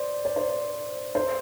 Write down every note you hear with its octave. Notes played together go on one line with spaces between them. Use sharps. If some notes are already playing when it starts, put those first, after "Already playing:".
Already playing: C5 D5
D5
C5
C5